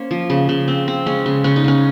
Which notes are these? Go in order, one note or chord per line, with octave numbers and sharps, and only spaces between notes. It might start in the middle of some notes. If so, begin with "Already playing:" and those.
Already playing: A#3 C#4 C5
F3
C#3
C#3
C4
C4
G#3 C#4
C#3
C#3 C#4
D#4
C#3 C#4